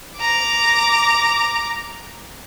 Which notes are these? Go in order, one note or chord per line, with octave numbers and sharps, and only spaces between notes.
A#5 D6